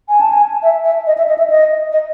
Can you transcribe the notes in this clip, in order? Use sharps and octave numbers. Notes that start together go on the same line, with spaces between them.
G#5
A5
G#5
E5
E5
D#5
E5
D#5
E5
D#5
D#5